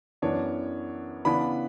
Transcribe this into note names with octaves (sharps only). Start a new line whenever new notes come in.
F#2 E3 B3 D4 C#5
C#3 E3 B3 D4 B5